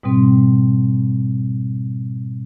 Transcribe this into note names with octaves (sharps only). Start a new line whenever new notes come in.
G#2 B2 G3 C4